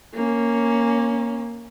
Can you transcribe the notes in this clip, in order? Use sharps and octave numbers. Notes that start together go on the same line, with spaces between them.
A#3 C#4